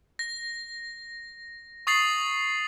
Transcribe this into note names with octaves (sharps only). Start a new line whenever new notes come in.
A#6
C#6 D#6 A6 C7 F#7